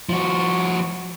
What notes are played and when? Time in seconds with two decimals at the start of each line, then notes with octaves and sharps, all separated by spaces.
0.09 F3 F#4